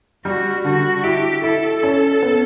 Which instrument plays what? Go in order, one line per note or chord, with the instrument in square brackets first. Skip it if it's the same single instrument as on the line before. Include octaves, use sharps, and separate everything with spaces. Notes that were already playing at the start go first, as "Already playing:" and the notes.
[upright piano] G3 [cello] F#4
[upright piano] D3 [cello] F#4
[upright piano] E4 [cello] G4
[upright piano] E4 [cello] A4
[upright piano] C#4
B3